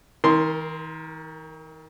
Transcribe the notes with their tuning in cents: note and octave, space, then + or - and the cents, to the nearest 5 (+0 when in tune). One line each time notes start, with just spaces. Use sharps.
D#3 +45 A#4 +0 C6 +0